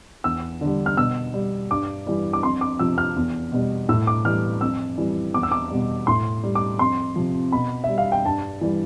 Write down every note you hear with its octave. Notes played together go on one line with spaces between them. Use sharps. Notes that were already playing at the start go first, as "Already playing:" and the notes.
E2 E6
D3 G3
F6
B2 E6
G3
G2 D6
E3 G3
D6
F2 C6
D6
C3 F3 E6
F6
E2
B2 G3
A2 E6
D6
E3 G3 F6
F2 E6
E3 G3
E2 D6
E6
D6
B2 G3
A2 C6
G3
D6
F2 C6
C3 F3
B2 B5
G3 E5
F5
G5
G2 A5
E3 G3